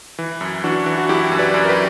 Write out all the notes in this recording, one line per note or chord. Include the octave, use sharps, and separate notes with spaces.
E3
F#2
E3 D4 F#4
E3
F#4
F#2 E4 G4
F#2
B4 D5
F#2
A#4
G4 B4